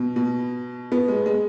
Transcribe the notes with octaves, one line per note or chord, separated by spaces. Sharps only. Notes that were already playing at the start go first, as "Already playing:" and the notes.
Already playing: B2
B2
B3
G#3
G#3